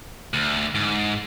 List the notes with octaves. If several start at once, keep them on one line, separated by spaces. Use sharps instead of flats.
D2
G#2